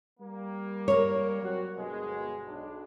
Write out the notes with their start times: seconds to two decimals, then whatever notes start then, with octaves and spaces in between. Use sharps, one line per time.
0.20 G3 A#3
0.88 A#4 C#5
1.42 F#3 C4 F#4
1.77 G1 B2 G#3
2.45 B1 D4